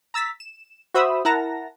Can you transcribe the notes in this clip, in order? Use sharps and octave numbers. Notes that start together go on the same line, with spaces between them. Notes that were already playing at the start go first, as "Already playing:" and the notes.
A#5 E6 A6 B6
E7
F#4 C5 E5 B5 D#6 E6
E4 A#4 F#5 A5 A#5 A#6